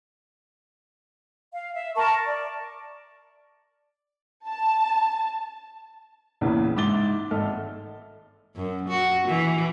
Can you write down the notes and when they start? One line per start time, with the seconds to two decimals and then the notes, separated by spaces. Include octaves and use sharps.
1.53 F5
1.74 E5
1.96 A#4 A5 C#6
2.25 D5
4.48 A5
6.41 A#1 E2 C#3 E3
6.76 G#2 E5 D6 A6 G7
7.31 G#1 A4 D#5 E5 F6
8.56 F#2
8.88 F#4
9.28 E3